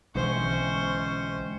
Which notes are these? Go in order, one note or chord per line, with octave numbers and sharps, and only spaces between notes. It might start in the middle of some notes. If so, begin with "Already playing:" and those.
B1 D3 E3 G#3 C4 C#4 C5 C#6